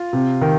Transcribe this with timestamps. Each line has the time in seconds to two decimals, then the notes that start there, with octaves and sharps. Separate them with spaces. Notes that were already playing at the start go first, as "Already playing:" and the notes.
Already playing: F4
0.13 C3
0.41 D#3